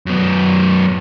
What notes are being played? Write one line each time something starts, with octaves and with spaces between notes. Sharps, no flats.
F#2 B3